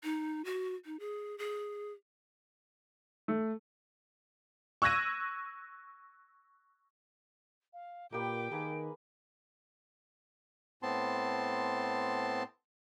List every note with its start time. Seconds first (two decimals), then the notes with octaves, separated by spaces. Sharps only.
0.04 D#4
0.45 F#4
0.85 D#4
1.00 G#4
1.38 G#4
3.28 A3
4.82 C#6 E6 F#6 G#6 A#6 D#7
7.74 F5
8.13 A#2 A#3 G4 B4 G5 D6 D7
8.52 D#3 A#3 G#4 B4
10.83 A2 B3 C4 A5 C6